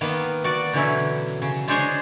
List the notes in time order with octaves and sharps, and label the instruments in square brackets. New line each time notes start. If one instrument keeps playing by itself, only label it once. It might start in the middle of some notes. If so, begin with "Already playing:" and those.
[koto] D#3 A#3 B3
F#4 D5
B2 D3 E3 F#3 C#4 E4
C#3
G#3 D4 G#4 C5 C#5 D#5